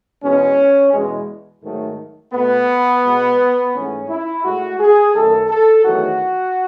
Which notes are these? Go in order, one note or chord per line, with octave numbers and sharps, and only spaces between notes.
E2 B2 G#3 C#4
E2 B2 G#3
G#2 D#3 F#3 A3
B2 A3 B3
B2 G#3
G#2 E3 A3 C#4
E4
A2 G#3 F#4
G#4
F#2 D#3 A3 A4
A4
E2 D#3 F#3 A3 F#4